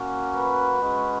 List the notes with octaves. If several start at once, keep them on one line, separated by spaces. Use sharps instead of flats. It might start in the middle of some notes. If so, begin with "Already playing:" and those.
Already playing: A#3 C#4 F#4
B4
G#3 C#4 F#4